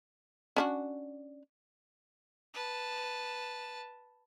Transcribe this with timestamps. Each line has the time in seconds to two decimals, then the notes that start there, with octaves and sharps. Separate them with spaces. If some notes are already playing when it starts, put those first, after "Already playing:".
0.56 C#4 D4 F#4
2.54 B4 A5